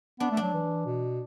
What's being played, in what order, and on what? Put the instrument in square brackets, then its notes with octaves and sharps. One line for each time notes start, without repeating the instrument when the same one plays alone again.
[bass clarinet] B3 [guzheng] D4
[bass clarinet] A3
[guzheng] D4
[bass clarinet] F#3
E3
B2